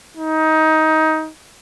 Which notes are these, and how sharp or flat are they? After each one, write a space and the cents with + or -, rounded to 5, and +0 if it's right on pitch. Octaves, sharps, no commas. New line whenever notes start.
D#4 +20